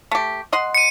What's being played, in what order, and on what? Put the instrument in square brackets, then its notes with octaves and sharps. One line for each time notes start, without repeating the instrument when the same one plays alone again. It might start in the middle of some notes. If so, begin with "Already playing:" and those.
[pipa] A3 G4
D#5 F#5 C6
[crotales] C#7 D#7